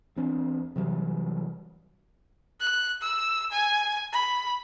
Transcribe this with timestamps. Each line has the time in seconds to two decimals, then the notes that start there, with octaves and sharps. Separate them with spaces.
0.16 E2 C4 D4
0.76 C3 E3 F#3 G3
2.61 F#6
3.02 E6
3.52 G#5
4.13 B5